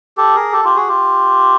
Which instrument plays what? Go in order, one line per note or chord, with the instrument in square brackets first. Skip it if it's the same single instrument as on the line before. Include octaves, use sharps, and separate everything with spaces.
[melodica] G4 A4
G#4 A#4
G4 A4
F4 G4
F#4 G#4
F4 G4